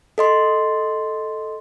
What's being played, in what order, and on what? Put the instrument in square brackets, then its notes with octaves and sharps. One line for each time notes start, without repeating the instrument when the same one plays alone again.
[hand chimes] A4 D#5 C6